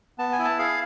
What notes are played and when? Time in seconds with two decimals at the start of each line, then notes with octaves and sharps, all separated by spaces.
0.18 B3 A5
0.33 G#5
0.39 E4
0.45 A5
0.59 G#4 F5